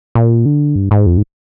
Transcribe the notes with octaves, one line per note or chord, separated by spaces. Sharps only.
A#2
D3
G2
G#2
F2
G#2